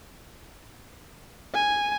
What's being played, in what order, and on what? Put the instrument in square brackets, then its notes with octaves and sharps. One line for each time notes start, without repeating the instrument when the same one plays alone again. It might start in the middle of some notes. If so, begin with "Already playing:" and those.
[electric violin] G#5